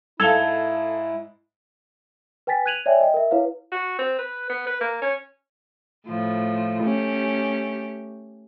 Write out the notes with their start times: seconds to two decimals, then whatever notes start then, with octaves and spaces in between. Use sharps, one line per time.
0.20 G#2 E4 A4 F5 G#6 F7 G7
2.47 B4 G5 G#5 A6 B6
2.66 F#6 G#6 D#7 F7 F#7
2.86 C#5 D5 E5 G5 G#5
3.01 D#5 G5
3.14 A#4 E5
3.31 E4 B4 C#5 F5
3.72 F#4
3.98 C4
4.19 B4
4.50 B3
4.67 B4
4.81 A#3
5.02 C#4
6.07 A2 F3
6.83 A3 C#4 G4